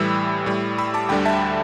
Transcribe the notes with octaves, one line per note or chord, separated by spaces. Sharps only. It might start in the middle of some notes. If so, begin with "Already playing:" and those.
Already playing: A2 E3 G3 B5 E6
A2 G3
B5 E6
A5 D6
D2 D3 G3 G5 B5
E5 A5